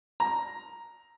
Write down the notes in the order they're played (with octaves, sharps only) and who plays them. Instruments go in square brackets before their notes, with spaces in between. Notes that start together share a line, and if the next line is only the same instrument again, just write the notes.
[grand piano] A#5